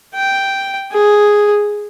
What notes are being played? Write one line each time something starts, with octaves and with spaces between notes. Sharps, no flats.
G5
G#4